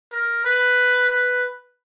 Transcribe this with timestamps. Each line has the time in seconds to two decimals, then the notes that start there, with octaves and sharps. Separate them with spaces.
0.12 A#4
0.45 B4
1.09 B4